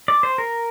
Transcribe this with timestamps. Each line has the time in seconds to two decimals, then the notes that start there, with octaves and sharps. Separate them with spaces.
0.08 D5
0.23 C5
0.38 A#4